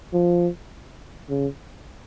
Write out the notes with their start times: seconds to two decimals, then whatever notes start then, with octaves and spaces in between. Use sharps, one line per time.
0.13 F3
1.30 C#3